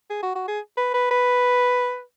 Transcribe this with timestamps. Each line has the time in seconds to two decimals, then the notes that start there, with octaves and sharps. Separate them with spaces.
0.10 G#4
0.23 F#4
0.35 F#4
0.48 G#4
0.77 B4
0.94 B4
1.11 B4